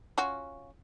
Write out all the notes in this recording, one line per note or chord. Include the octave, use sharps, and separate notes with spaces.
C#4 F4 F#4